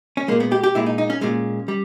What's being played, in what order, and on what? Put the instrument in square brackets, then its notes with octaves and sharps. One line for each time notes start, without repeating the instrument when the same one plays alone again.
[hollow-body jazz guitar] C#4
A#2 G#3 A#3
B3
G4
G4
A#2 G#3 E4
D#4
D#4
C#4
A#2 G#3 C#4
G3